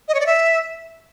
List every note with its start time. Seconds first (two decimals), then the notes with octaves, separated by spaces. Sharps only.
0.08 D#5
0.14 C#5
0.20 D5
0.26 E5